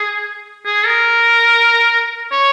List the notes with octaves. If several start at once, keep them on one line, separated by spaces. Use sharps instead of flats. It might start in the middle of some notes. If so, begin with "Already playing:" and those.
Already playing: G#4
G#4
A#4
C#5